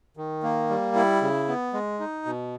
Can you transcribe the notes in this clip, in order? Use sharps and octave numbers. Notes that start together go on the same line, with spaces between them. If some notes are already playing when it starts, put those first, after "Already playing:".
D#3
A#3
G3
E4
C#3
B3
G#3
D#4
B2